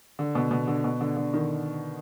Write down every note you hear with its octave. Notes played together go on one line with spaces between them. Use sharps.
D3
B2
B2
D3
B2
D3
D3
D#3